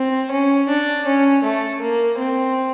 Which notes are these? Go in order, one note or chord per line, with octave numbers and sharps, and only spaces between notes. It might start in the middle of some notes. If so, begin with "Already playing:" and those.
Already playing: C4
C#4
D4
C#4
A3
A#3
C4